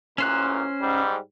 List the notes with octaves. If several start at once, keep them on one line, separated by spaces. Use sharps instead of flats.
A1 F#2 A#2 C#4 C5 F#6
G#2 G3